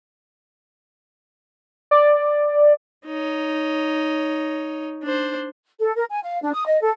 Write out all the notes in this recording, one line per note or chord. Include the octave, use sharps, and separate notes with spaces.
D5
D#4 C#5
D4 C5
A4
A#4
G#5
F5
D4
D#6
D#5
A4